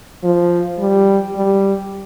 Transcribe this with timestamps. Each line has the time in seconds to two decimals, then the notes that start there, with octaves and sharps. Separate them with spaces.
0.24 F3
0.79 G3
1.35 G3